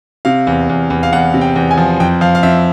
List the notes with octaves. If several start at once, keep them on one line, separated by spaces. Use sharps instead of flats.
C3 F5
E2
E2
E2
F5
E2 F#5
C3
G5
E2
G#5
F3
F2 G5
F3 F5
F5
F2 E5